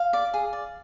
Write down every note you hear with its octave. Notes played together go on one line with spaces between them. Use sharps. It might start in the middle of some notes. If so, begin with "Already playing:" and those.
Already playing: F5
D5
G#4
D5